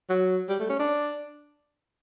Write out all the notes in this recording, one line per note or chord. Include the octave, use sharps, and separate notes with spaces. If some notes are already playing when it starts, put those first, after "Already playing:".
F#3
G3
A3
C#4
D4